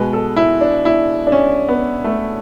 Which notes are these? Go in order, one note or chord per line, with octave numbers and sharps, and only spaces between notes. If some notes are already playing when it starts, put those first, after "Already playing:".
Already playing: B2 G#3 B4
A4
E4
D4
E4
D4
C#4
B3
A3